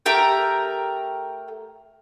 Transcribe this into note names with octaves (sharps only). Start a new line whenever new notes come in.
A3 G4 A#4 G5